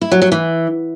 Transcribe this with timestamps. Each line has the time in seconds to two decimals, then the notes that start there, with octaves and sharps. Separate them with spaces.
0.01 E4
0.12 F#3
0.22 F#3
0.32 E3